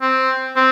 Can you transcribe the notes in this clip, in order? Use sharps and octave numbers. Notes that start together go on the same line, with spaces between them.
C4
C4